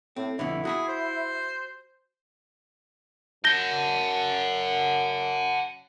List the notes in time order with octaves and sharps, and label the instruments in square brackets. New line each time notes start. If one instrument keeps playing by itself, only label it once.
[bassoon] A2 [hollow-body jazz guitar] C4
[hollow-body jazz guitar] F2 B2 D3 [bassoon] E4
[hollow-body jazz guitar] F#4 A#5 B5 [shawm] G#4
[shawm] C5
[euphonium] F#2 [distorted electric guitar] F#5 A5 [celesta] G6 A#6 G7